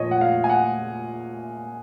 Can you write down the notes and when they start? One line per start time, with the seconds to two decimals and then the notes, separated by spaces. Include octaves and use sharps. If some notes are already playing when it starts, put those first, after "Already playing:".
Already playing: A#2 F3 C#5 D#5
0.11 F#5
0.21 F5
0.44 G#5
0.50 F#5